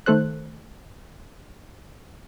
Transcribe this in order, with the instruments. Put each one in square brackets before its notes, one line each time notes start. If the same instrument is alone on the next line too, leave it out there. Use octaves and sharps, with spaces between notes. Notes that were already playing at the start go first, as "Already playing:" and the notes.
[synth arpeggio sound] D#3 A3 A4 C5 F#6